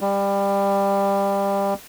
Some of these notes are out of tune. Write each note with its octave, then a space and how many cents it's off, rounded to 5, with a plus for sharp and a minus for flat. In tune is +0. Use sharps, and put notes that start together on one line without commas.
G3 +20